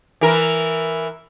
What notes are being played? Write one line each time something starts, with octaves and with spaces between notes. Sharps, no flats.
E3 A#4